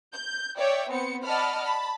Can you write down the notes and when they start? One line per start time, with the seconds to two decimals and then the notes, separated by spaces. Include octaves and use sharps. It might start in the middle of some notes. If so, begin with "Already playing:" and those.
0.14 G6
0.59 C#5 D5 E5 G5
0.90 B3 C4 C5 C#7
1.24 D5 D#5 F#5 A5 B5 F6
1.64 A5 B5